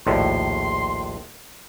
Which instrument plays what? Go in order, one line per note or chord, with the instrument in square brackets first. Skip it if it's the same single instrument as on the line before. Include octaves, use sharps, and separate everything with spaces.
[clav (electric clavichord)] A#1 D#2 A2 [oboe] C6